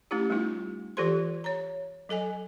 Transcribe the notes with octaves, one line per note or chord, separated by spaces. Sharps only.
A3 C#4 E4 G4
G3 A3 B3 D#4 F4
E3 F4 G4 A4 C5 C6
C#5 A#5
F#3 A4 D#5 G#5